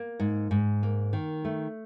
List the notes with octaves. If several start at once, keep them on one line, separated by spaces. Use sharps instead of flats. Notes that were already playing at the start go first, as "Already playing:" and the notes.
Already playing: A#3
G#2
G#2
A#3
D#3
A3